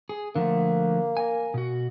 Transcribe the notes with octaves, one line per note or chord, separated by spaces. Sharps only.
G#4
D3 F3 A3 A#3
A#4 G#5
B2 F#4